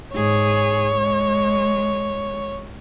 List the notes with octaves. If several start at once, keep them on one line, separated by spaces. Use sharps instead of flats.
G#2 G#4 C#5
G#3